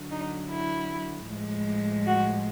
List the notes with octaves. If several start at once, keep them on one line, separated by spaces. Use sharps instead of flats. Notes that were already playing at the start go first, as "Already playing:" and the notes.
Already playing: D3 F#3
D#4
E4
A2 F3 G#3
F#4